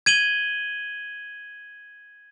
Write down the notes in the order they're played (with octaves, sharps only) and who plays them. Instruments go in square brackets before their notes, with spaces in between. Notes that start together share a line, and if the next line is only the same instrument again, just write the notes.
[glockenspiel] G#6 D#7 F#7 G7